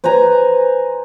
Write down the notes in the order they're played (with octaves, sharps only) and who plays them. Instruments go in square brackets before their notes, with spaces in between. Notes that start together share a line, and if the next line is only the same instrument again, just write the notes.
[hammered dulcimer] B4 C5 G#5 A#5